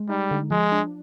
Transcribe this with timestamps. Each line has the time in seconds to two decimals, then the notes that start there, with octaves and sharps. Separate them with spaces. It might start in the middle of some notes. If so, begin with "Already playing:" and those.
Already playing: G#3
0.09 G3 D#4
0.31 D3
0.51 F3 G#3
0.72 D4